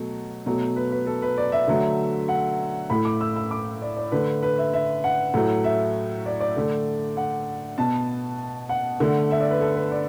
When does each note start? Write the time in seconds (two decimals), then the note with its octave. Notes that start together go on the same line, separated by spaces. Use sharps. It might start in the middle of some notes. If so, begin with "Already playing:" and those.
Already playing: B2 F#3 A3
0.46 B2 F#3 A3
0.76 B4
0.92 B4
1.06 A4
1.22 B4
1.38 D5
1.52 E5
1.67 D3 F#3 A3
2.28 F#5
2.90 A2 A3 B5
3.05 D6
3.21 E6
3.36 E6
3.51 D6
3.82 D5
3.97 D5
4.12 D3 A3 B4
4.43 B4
4.58 E5
4.74 E5
5.04 F#5
5.34 A2 F#3 A3
5.64 E5
6.26 D5
6.40 D5
6.57 D3 A3
7.17 F#5
7.78 B2 B3 A5
8.69 F#5
9.00 D3 A3
9.31 E5
9.40 D5
9.51 B4
9.61 A4
9.76 B4
9.92 D5